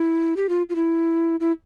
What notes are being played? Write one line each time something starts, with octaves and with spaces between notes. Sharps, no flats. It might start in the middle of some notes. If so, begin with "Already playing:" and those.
Already playing: E4
G4
F4
F4
E4
E4